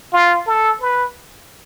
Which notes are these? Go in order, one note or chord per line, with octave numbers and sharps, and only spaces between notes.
F4
A4
B4